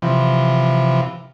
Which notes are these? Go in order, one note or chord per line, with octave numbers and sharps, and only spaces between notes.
C3 E3 F3